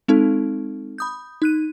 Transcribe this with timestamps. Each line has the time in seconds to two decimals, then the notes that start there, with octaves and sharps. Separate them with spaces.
0.08 G#3 C4 D#4 A4
0.98 B5 D#6 G6
1.42 D#4 F#6 D#7